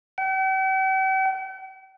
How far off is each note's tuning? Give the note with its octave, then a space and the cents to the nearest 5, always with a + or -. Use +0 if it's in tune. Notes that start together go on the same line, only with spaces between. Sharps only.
G5 -45